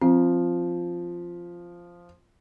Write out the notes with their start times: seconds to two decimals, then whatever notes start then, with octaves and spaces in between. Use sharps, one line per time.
0.02 F3 C4